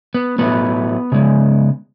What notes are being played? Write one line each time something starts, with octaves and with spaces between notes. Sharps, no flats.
B3
A2 F#3 A3 B3
C#3 G#3